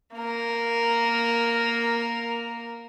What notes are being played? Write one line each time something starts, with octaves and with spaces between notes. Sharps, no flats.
A#3 A#4